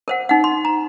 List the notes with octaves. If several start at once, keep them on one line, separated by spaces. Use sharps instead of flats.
A#4 C5 F#5
D#4 F#5
C6
A#5